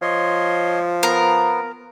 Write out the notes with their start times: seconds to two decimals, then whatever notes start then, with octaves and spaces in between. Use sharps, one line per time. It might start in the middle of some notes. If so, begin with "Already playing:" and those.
0.02 F3 C#5 D#5 C6
1.03 B3 A#4